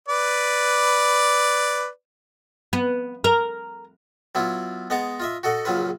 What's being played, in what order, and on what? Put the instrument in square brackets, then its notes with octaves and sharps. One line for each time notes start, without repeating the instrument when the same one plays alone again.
[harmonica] B4 D5
[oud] B3
A#4
[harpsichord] F#3 B3 E4 F4
G#3 B3 D#5 F#5 A5 A#5
F4 D#5 E5
F#4 A4 D#5 F#5
A#1 C#3 F#3 F4 B4